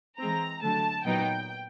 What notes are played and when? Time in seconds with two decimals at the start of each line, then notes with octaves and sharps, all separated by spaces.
0.19 E3 G#3 C4 A#5
0.62 D3 F#3 A3 A5
1.05 A#2 F#3 B3 D#4 G5